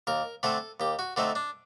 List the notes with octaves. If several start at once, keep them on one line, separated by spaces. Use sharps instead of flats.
D#2 A#4
D3 A3 C4 A4
D#2 G4
F#4
D3 A3 C4 D#4
D4